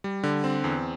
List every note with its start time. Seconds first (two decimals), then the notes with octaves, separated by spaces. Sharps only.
0.04 G3
0.23 D3
0.44 C4
0.64 E2